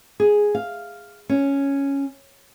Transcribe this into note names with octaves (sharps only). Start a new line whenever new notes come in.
G#4
F5
C#4